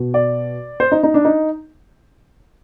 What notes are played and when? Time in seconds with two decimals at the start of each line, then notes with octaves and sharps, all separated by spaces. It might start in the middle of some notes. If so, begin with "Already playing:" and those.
Already playing: B2
0.14 D5
0.80 C5
0.92 D#4
1.03 D#4
1.14 D4
1.25 D#4